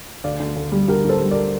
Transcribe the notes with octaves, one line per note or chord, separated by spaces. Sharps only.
D2 D5 F5
D2
D2
G3
D2 G4 A#4
D3 A4 C5
G3
A#4 D5